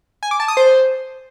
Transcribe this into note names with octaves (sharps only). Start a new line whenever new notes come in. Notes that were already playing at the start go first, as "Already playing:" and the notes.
G#5
D6
A5
D#6
C5